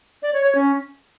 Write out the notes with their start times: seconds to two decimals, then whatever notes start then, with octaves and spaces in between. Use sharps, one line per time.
0.23 D5
0.33 C#5
0.44 C#5
0.55 C#4